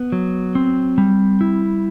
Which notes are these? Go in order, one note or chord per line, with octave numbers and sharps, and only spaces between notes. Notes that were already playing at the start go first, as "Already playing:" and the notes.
Already playing: B3
F#3
C4
G3
E4